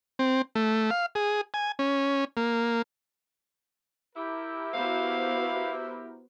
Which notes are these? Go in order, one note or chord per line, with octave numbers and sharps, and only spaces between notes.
C4
A3
F5
G#4
G#5
C#4
A#3
E4 G4 A#4
B3 F#4 C5 F5